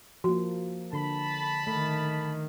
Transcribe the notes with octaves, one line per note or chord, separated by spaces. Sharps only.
F3 A#3 F#4
D3 A5 B5
D#3 A3